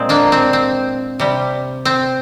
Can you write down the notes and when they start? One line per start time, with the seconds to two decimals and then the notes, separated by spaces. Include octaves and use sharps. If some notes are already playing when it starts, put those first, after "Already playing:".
Already playing: A#2 G#3 C4
0.09 A#3 D4
0.32 C4
0.53 C4
1.20 C3 G3
1.85 C4